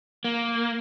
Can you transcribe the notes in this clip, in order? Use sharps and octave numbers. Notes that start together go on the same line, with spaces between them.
A#3